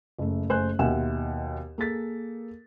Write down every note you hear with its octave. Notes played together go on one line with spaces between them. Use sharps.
F#1 A3
F#1 A3 C5 G#5 F#6
D#2 B2 E5 F#5 G#5 E7
A#3 G#4 A4 A6 B6